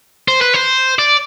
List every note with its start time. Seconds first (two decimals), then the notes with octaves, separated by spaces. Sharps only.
0.28 C5
0.41 B4
0.54 C5
0.99 D5